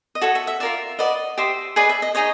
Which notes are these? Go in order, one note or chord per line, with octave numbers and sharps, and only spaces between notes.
D#5
F#4 A4 C#5 E5
E5
E5
F4 A#4 D5 E5
F#4 B4 D5 D#5
G4 C5 D#5 E5
G#4 B4 D5 D#5
E5
D#5
D#4 G#4 C#5 D#5